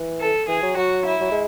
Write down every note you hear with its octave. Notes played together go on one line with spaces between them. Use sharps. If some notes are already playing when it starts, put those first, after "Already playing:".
Already playing: E3
A4
E3 G#4
F#3
F#3 F#4
E4
F#3
G#3